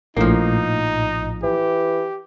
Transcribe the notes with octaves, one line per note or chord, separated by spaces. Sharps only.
A#1 A2 F3 A#3 D#4
E3 G4